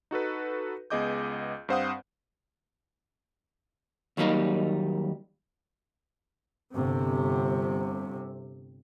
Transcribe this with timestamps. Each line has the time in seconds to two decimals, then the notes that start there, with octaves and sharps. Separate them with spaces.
0.11 D#4 F#4 A4 B4
0.90 C#2 B3 G#4 D#5 D6 G6
1.69 G2 C4 C5 F5 F#5 D#6
4.17 D#2 F#3 G3 A#3 D#4
6.74 G1 C3